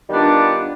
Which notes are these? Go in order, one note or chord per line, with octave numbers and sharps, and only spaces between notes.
D#3 G3 B3 D4 F4